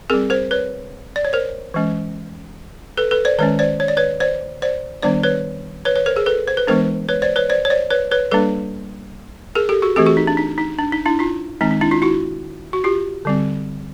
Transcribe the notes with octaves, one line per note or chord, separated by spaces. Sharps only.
G3 C4 G#4 A#4
A#4 C5
B4 C#5
D5
C#5
A#4 C5
E3 G#3 C#4
A4 B4
A4 B4
C5 D5
D#3 G#3 C#4 B4 C#5
C5 D5
C#5
D5
B4 C#5
C5 D5
C5 D5
D#3 G3 B3 D4 C5 D5
B4 C#5
B4 C#5
B4 C#5
A#4 C5
G#4 A#4
A4 B4
C5
B4
E3 G#3 B3 D4 A#4 C5
B4 C#5
C5 D5
B4 C#5
C5 D5
C#5
C5 D5
B4 C#5
B4 C#5
G3 A#3 D4 A4 B4
G#4 A#4
G4 A4
F#4 G#4
E3 A3 C4 G4 A4
F#4 G#4
D#4
D4
D#4
D#4
D4
D#4
D4 E4
D#4 F4
D#3 G#3 C4 D#4
D#4
D4 E4
D#4 F4
E4 F#4
F#4
F4 G4
D3 G3 C4